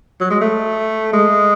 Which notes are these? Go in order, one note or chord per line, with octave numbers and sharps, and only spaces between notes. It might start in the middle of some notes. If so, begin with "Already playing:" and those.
F#3
G#3
A3
G#3